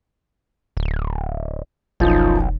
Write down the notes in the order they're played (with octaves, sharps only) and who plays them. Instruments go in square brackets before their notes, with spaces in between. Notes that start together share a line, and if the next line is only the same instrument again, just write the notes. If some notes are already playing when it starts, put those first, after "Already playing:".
[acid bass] D1
[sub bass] E1 [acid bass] B1 [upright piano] F#2 F3 D#4